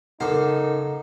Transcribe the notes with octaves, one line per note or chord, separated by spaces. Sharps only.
F#2 C#3 D#4 A4 A#4 C5 F#5 D6